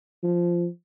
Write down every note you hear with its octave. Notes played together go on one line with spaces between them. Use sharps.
F3